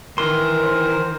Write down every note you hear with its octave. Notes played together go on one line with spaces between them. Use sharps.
D#3 E3 A#4 C6
C5